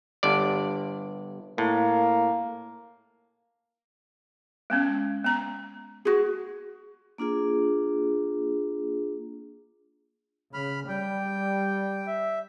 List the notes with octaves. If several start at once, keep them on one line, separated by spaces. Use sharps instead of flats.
G1 G2 D5
A2 A#3
G#3 B3 C#4
B3 A#5
F#4 G#4
A#3 D4 F4 G#4
C#3 B5 F6
G3 G5
E5